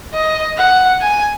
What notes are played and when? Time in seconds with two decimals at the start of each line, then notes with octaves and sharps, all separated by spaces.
0.14 D#5
0.57 F#5
1.01 G#5